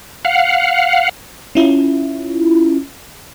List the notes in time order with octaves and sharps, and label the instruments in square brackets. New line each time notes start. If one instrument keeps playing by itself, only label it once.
[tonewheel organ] F5 F#5
[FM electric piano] C#4 E4 F4